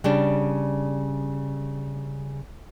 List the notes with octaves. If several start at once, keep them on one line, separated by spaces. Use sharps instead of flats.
C#3 G3 D4